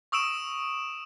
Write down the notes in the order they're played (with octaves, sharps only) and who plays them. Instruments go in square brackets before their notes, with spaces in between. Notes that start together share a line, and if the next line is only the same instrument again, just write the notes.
[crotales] C#6 D#6 E6 D7 E7